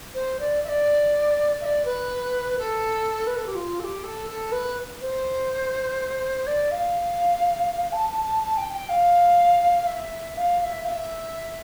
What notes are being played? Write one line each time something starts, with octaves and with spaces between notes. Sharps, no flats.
C5
D5
E5
D5
E5
D5
B4
A4
B4
A4
G4
F4
A4
G4
A4
A4
B4
C5
D5
F5
A5
A5
A5
A5
G5
G5
F5
E5
F5
F5
E5
F5
E5